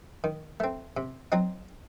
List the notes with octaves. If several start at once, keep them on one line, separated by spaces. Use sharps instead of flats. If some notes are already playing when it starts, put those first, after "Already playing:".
D#3
A3 C4
C3
F#3 C4 D#4